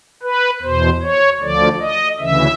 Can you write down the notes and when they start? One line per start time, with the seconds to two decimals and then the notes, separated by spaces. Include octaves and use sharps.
0.23 B4
0.62 E2 B2 C5
1.02 C#5
1.41 D2 D3 F3 D5
1.81 D#5
2.19 D2 C#3 E3 E5